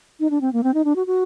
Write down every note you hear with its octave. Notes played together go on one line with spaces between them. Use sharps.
D#4
D4
C4
A#3
C4
D#4
D4
F#4
F#4